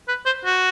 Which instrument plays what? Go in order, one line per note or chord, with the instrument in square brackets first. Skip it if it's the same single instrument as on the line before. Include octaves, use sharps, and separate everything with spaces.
[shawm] B4
C5
F#4